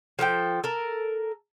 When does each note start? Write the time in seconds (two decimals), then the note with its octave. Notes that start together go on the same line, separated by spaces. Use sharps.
0.19 F3 A4 A#4 G5
0.64 A4 A#4